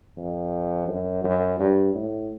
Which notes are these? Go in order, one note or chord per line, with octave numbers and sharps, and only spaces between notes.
F2
F#2
F#2
G2
A2